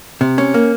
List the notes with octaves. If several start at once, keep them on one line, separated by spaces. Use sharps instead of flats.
C3
C#4
A#3